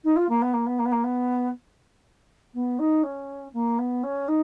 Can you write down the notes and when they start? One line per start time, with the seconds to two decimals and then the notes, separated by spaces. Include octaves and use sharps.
0.04 D#4
0.16 F4
0.29 A#3
0.41 B3
0.53 A#3
0.66 B3
0.79 A#3
0.85 B3
0.92 A#3
1.03 B3
2.54 B3
2.79 D#4
3.03 C#4
3.53 A#3
3.78 B3
4.03 C#4
4.28 D#4